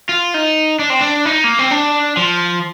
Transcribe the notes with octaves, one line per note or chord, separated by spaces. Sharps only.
F4
D#4
D4
C4
D4
D#4
A#3
C4
D4
F3